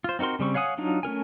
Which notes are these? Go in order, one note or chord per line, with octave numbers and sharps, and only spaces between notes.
F4 C5
C4 D#4 F#4 A#4 C6
C#3 G3 C4 C#6
C#5 F5 F#5 G#5 D#6
F#3 D4 D#4 F4
A3 C#4 A#4 G#5